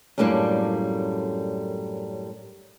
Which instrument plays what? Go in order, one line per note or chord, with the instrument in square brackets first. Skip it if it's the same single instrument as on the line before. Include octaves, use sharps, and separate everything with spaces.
[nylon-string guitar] F#2 A2 G3 A#3 D4